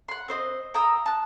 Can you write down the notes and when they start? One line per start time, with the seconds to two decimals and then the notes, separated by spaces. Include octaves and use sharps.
0.08 F#5 C6
0.28 C4 C5 D#5
0.74 G5 A#5 D#6 E6
1.06 A5 F#6